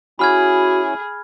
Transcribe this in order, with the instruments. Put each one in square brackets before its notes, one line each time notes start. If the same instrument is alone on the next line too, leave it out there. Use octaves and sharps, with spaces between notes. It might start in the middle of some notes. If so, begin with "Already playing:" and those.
[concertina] C#4 E4 [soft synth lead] F#4 [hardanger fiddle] G#4 [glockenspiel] B5 F6 G#6